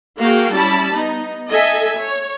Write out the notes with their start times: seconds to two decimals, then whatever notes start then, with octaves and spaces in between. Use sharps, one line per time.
0.19 A#3 F#4 G#4 F5 G5
0.54 G3 C#4 E4 A5 B5
0.90 B3 D#4
1.50 A4 D#5 E5 G#5
2.00 C#5